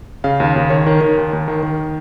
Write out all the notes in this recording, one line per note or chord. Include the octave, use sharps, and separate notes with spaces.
C#3 F5
D#2
D#2
D#3 C#5
D#3 A#4
D#3 A#4
D#2
D#2
D#3
D#3